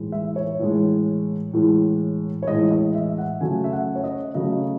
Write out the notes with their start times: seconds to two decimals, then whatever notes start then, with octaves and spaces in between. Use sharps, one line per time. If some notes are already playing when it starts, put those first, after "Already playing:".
Already playing: A2 E3 G#3
0.12 E5
0.36 C#5
0.59 A2 E3 G#3
1.53 A2 E3 G#3
2.43 C#5
2.47 A2 E3 G#3 D#5
2.71 D#5
2.95 E5
3.18 F#5
3.41 C#3 F#3 A3 G#5
3.64 E5
3.73 F#5
3.96 C#5
4.04 D#5
4.35 C#3 F#3 A3 D#5